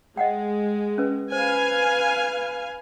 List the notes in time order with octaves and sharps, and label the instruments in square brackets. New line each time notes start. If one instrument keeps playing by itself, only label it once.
[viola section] G#3 [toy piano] D#5 F#5 G5
[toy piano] C#4 B4
[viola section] B4 F5 G#5 [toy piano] C5